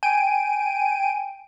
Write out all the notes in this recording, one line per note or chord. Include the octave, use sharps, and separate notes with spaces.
G5 G#5 D7 D#7